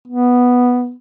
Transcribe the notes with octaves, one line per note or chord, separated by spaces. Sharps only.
B3